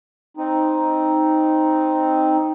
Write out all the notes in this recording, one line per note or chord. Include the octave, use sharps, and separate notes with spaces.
C4 D#4